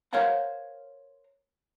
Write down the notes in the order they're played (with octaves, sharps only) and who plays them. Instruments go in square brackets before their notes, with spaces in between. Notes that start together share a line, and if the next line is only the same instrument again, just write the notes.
[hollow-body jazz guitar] A#4 C5 C#5 F5 F#5 A#5